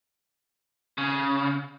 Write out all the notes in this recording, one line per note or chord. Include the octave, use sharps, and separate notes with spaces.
C#3